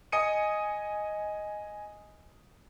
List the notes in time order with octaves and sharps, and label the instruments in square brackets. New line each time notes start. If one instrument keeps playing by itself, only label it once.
[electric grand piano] D#5 G#5 D#6 C#7 D#7